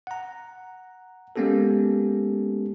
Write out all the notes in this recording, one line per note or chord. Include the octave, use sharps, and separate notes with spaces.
F#5 A#5
G#3 A#3 B3 C#4 G4 A4